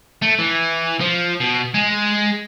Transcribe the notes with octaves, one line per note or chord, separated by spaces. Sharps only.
A3
E3
F3
B2
G#3